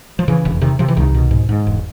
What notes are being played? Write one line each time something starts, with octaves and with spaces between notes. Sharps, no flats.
F3
C#3 E3
E1
C3 D#3
C3 F3
E3
C2 D#3
B2
G#2
G#2
E1